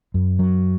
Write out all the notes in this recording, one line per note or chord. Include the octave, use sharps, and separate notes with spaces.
F#2
F#3